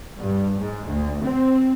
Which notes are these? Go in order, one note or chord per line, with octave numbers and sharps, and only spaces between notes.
G2
G#2
D2
C4